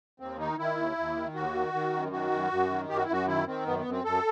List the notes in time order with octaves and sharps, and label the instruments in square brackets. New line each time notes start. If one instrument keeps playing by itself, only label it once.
[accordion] D#2 C4
D#3 D#4
D#3 E4
D#2
D#2
D#3
D#2 F#4
D#3
D#3
F#2
D#3 F#4
F#2
F#2
D#3
F#2 G4
F#4
E4
F#2 F#4
D#3 E4
D#3 C4
F#2 B3
B3
F#2
C4
F#2 A4